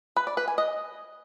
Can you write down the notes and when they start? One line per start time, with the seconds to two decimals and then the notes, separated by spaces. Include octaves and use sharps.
0.16 B4
0.27 D5
0.37 B4
0.48 G#5
0.58 D#5